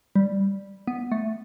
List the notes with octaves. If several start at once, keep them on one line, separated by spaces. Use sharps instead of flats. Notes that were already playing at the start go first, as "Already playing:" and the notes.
G3
B3
A3